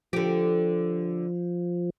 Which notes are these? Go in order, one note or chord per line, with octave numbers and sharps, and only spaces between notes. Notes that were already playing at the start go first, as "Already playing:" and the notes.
D3 F3 G4